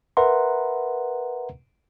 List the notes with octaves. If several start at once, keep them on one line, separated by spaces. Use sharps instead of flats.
A#4 B4 E5 F#5 A#5 C6